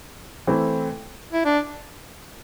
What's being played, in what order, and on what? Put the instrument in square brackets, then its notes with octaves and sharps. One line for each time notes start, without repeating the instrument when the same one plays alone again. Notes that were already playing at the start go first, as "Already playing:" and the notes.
[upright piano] E3 A3 C4 E4
[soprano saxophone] E4
D4